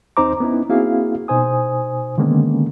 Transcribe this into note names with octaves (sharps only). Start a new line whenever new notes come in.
D#2 C4 D#4 C5 A#5 D6
B3 C#4 D#4 E4
A#3 C4 E4 F#4 G#4 F5
B2 D#4 C5 G#5 D#6
D3 D#3 G#3 A#3 B3 C#4